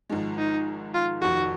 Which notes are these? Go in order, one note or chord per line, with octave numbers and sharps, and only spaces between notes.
G#1 G#2 F3 G#3
D#4
F4
F1 F2 D#3 F#4